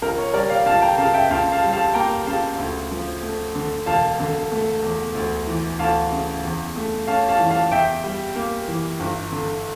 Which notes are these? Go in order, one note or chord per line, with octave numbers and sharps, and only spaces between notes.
C#2 A#4
C#5
G3 A#4 D5
D5 F5
C#2 F5 A5
G5 A#5
C#3 F5 A5
E5 G5
C#2 F5 A5
F5 A5
G3
F5 A5
A#3 G5 A#5
C#3 F5 A5
D2
F3
A3
D3
E1 F5 A5
D3
A3
E2
D2
E3
D2 F5 A5
C#3
E2
A3
C#4 F5 A5
F5 A5
E3
F5 A5
E2 E5 G5
G3
A#3
E3
G1
D3